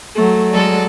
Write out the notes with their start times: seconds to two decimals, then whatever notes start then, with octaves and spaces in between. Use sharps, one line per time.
0.15 F#3 A3
0.52 F#3 G#3 A4 D5